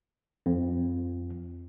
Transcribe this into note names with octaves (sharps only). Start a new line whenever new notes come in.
F2